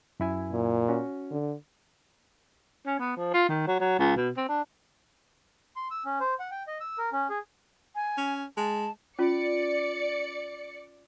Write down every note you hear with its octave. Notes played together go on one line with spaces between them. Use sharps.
F#2 E4 G#5
A#2
C#4 F#4
D3
C#4
B3
F3
F4
D#3
F#3
F#3
C#2
B2
C4
D4
C6
E6
C#4
C5
F#5
G5
D#5
E6
A#4
C#4
G#4
G#5
C#4
G#3 A5
C#4 F4 D5 C#7